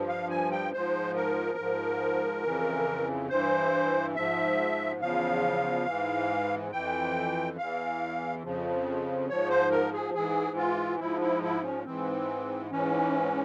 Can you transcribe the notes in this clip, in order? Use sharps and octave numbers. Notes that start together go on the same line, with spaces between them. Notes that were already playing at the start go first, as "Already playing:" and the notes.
Already playing: G2 F3
F5
G#5
G5
G#2 F3 C5
A#4
G#2 F3
F2 C#3 E3
G2 E3 C5
G#2 F3 E5
E2 C#3 F3 F5
G#2 E3
F2 E3 G5
E2 E3 F5
F2 C#3 F3
G#2 F3 C#5
C5
A#4
G#4
G#2 E3 G#4
F4
G#2 F3 E4
E4
E4
C#4
G#2 E3 C4
G#2 E3 C#4